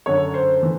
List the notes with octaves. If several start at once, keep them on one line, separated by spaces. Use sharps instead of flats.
F#2 D3 C#5
C5
E3